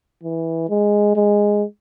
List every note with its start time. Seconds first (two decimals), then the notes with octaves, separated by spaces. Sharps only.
0.23 E3
0.70 G#3
1.16 G#3